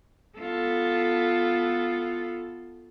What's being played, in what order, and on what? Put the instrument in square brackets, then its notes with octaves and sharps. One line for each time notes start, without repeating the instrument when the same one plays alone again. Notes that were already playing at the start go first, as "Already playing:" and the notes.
[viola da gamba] B3 F4 A4